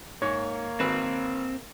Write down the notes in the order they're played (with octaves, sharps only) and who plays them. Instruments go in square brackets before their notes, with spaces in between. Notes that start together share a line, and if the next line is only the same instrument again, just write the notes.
[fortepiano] G#2 [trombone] A#3 [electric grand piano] C#5
[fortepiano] G#1 B4 [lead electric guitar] C4